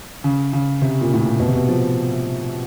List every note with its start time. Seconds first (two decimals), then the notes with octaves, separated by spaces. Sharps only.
0.24 C#3
0.53 C#3
0.82 C3
1.01 A#2
1.14 A2
1.21 A#2
1.40 B2
1.47 C3
1.55 B2
1.69 F3